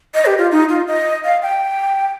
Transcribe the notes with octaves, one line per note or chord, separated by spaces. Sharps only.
D#5
G4
F4
D#4
F4
D#5
F5
G5